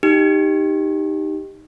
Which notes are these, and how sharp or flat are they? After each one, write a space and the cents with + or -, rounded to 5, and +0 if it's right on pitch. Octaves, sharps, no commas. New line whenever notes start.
D#4 +0 G4 +0